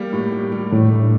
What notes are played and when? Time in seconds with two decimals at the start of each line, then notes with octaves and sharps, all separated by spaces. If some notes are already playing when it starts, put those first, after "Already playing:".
Already playing: G3 A#3
0.13 A2
0.32 G3
0.52 G3
0.71 A2 A3
0.92 D4